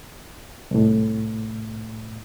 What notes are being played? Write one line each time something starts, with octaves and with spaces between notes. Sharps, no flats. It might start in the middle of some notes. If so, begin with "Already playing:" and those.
C2 A2